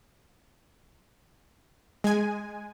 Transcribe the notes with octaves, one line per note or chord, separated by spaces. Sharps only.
G#3 G#5